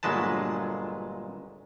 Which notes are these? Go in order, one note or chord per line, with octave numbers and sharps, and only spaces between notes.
G1 A#2 F#3 G#3 B4 A5